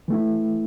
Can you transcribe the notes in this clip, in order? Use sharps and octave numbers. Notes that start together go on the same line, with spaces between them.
E3 A3 E4